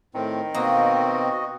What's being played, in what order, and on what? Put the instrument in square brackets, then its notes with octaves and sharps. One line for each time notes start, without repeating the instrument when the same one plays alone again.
[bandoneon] A2 C4 [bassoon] D#3
[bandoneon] B2 C4 [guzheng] A#3 [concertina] F#4 D#5